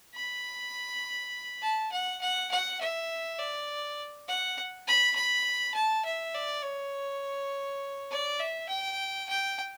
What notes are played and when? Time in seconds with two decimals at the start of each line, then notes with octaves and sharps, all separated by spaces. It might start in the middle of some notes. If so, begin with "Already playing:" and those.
0.15 B5
1.63 A5
1.92 F#5
2.21 F#5
2.51 F#5
2.81 E5
3.39 D5
4.28 F#5
4.87 B5
5.15 B5
5.74 A5
6.05 E5
6.34 D5
6.63 C#5
8.11 D5
8.40 E5
8.69 G5
9.29 G5